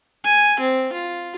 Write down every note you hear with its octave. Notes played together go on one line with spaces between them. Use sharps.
G#5
C4
F4